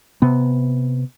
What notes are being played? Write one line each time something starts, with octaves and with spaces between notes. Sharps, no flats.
C3 B3